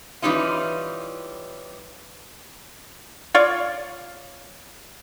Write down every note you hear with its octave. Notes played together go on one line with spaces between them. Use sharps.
E3 G3 C#4 D#4 F4
F4 C#5 D5